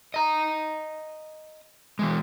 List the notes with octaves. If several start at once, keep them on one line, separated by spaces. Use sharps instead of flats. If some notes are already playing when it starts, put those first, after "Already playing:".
D#5 A#5
E3 G#3